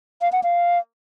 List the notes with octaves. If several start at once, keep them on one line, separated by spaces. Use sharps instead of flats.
F5
F#5
F5